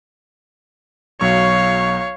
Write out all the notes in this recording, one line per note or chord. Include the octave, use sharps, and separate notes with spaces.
B1 F#3 C#5 F5 C#6